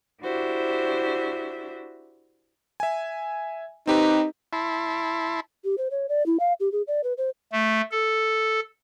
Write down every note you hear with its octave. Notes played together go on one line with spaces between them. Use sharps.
D4 E4 F#4 G4 C5 E5
E5 G#5
C4 D#4 G4 B4
E4 A5 B5 C6
G4
C5
C#5
D5
E4
F5
G4
G#4
D5
B4
C5
A3
A4